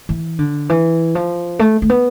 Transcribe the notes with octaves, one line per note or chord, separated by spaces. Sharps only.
E3
D3
E3
F3
A3
A3
B3